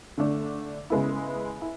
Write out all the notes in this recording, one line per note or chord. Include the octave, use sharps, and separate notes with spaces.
D3 A3 D4
C#3 G#3 B3 E4
E4